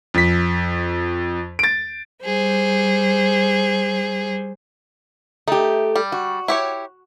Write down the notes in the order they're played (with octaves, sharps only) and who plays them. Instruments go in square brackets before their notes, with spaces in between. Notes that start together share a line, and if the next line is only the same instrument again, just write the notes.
[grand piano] F2 B6
A6 D7
[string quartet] G3 G#4 C5
[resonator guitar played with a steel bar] A3 G4 [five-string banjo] D#4
[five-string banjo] G3
[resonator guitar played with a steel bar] F#4
[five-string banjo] E4 G4 C#5